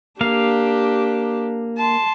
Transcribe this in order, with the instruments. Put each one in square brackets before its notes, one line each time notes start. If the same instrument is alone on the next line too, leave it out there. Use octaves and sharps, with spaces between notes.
[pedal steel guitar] A#3 F5 [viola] D4 G4
[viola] A5 C6